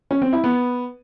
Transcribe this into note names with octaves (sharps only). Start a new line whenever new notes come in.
C#4
C4
E4
B3